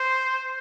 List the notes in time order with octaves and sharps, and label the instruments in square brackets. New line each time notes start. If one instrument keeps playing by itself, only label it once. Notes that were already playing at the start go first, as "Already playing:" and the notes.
Already playing: [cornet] C5